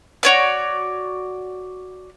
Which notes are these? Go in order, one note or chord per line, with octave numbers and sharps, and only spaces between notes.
F#4 C#5 D5